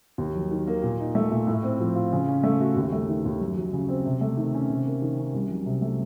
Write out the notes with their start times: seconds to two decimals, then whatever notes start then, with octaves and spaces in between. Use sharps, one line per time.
0.18 D#2
0.35 F#3
0.51 D#3
0.67 A#3
0.83 A#2
1.00 D#4
1.15 A3
1.31 A#2
1.47 A2
1.63 C4
1.80 F3
1.95 F4
2.12 C#3
2.28 C#4
2.44 A3
2.60 F#4
2.76 D#2
2.93 A3
3.09 D#3
3.25 D#2
3.41 F#2
3.57 F#3
3.73 C#3
3.89 C4
4.06 C3
4.21 A3
4.37 D#3
4.54 C#4
4.70 C3
4.86 A#3
5.02 D#3
5.18 C#4
5.34 C2
5.51 F#3
5.66 C3
5.82 A3